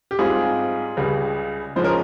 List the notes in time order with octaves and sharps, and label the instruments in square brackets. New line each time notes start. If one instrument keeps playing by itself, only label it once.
[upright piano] G4
G#2 G3 C4 F4 G#4
C#2 C#3 G3
G#2 F3 G#3 C#4 C5
A#4